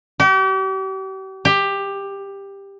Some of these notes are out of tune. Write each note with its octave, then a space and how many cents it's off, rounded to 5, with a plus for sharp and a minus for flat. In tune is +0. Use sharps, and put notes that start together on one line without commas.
G4 -40
G4 +15